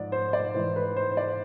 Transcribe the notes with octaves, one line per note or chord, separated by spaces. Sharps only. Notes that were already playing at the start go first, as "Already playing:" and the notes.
Already playing: G#2 F3 D5
C5
D5
G#2 E3 C5
B4
C5
C5
D5